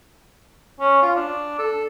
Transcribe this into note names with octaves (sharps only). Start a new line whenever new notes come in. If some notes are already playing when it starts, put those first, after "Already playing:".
C#4
F4
D4
A4